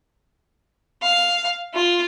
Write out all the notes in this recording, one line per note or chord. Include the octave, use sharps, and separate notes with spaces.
F5
F4